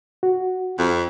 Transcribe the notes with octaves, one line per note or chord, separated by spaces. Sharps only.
F#4
F2